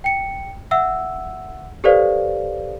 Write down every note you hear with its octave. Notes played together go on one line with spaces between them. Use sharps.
G5 C#7
E5 F#5 E6
G4 A4 B4 C5 D5 F5